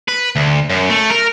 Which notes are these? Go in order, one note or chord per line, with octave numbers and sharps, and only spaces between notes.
B4
D2
F#2
A3
A#4